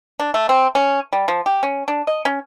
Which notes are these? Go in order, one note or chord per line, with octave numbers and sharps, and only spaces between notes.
D4
A3
C4
C#4
G3
F3
G4
C#4
D4
D#5
C#4